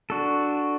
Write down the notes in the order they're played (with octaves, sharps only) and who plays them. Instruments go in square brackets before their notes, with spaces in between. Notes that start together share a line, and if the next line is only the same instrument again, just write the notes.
[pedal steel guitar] D4 F#4 A4